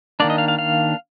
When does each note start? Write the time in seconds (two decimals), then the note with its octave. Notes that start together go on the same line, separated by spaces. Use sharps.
0.20 D#3 A#3 D4 D5
0.30 D#5
0.38 F5
0.48 F5
0.59 F5